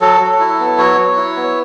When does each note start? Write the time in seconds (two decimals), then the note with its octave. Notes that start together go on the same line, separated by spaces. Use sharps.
0.01 F#3 A4
0.21 F#3
0.40 E4
0.60 B3
0.78 F#3 C#5
0.98 F#3
1.17 E4
1.36 B3